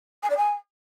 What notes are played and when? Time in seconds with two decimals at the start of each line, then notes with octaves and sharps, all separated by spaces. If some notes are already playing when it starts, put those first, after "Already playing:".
0.23 G#5
0.30 D5
0.37 G#5